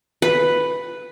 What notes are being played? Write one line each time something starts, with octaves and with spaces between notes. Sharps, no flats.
B4